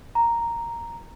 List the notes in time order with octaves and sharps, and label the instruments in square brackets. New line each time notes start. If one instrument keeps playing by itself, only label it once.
[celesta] A#5